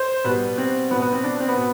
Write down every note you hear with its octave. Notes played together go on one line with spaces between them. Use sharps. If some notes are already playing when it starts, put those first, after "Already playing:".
Already playing: C5
B2 G3 B4
C4
B2 F#3 B3
B3
C4
D4
C4
B3
B2